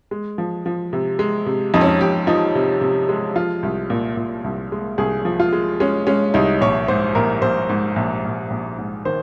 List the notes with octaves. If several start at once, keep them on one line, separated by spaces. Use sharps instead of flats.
G#3
F3
F3
C3
G#3
C3
F2 D#4
C#4
D#4
F2 G4
F3 D#4
C3
C3
G#3
F3 F4
C2
A#2
A#2
C2
G#3
C2 G#4
F3
F4
G#3
G#3 C#4
G#3 C#4
C2 D#4
A#1 C#5
G#2 C5
A#1 A#4
A#1 C5
G#2
A#1
A#1
A#1
G#2
D#3 C5